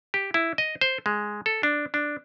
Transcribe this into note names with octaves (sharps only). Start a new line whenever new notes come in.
G4
E4
D#5
C5
G#3
A4
D4
D4